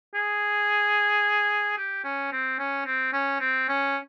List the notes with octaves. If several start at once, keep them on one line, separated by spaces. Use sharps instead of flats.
G#4
G4
C#4
C4
C#4
C4
C#4
C4
C#4